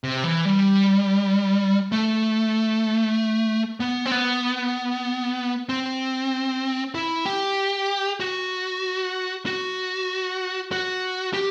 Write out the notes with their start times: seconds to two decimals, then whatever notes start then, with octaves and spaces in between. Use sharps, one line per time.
0.04 C3
0.24 E3
0.45 G3
1.92 A3
3.80 B3
4.06 C4
4.12 B3
5.69 C4
6.94 E4
7.26 G4
8.20 F#4
9.46 F#4
10.72 F#4
11.34 G4